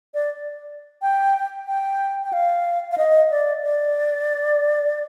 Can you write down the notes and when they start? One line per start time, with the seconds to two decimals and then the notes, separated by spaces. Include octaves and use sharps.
0.14 D5
1.02 G5
1.67 G5
2.23 G5
2.33 F5
2.91 F5
2.98 D#5
3.31 D5
3.63 D5